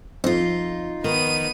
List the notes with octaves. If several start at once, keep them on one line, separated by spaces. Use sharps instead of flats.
F2 D#4 F4
D#3 B3 D#7